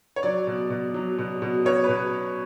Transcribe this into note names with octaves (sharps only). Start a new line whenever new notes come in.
C#5
F#3 D5
B2
B2
F#3
B2
B2
B2 C#5
B2 B4